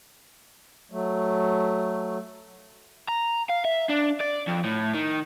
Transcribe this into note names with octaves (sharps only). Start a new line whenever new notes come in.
F#3 A3
A#5
F5
E5
D4
D5
F2
A2
D#3